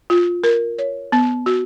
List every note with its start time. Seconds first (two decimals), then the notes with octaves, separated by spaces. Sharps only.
0.10 F4
0.44 A#4
0.78 C#5
1.12 B3
1.46 F#4